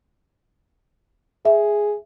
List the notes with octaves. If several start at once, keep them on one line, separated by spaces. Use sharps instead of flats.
G#4 E5